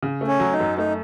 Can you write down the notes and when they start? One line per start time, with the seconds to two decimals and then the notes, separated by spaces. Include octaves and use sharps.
0.03 C#3
0.21 A3
0.27 C#4
0.40 F#3
0.53 D#4
0.60 F#2
0.78 A3 D#4